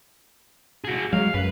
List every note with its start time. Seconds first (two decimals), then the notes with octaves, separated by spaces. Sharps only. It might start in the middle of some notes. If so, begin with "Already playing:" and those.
0.84 F#4 G#4
1.13 F#3 G#3 F5
1.34 F#2 B4